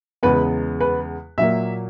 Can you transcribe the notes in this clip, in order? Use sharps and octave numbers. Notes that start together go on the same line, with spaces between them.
E2 C#3 G#3 B3 B4
B4
A#2 F#3 A#3 E5